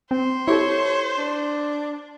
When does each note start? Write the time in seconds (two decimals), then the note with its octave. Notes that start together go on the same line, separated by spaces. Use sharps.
0.11 C4 C5
0.48 E4 G4 A4 C#5
1.18 D4